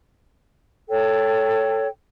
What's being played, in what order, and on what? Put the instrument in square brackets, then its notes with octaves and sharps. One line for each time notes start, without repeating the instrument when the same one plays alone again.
[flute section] A4 C#5 G5